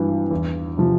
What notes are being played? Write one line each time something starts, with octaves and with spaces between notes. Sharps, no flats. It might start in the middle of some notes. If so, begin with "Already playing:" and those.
Already playing: G#1 G2 E3
E2
C3 F3